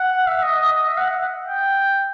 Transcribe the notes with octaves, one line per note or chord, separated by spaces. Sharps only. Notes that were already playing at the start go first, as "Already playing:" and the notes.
Already playing: F#5
E5
D#5
D#5
D#5
E5
F#5
G5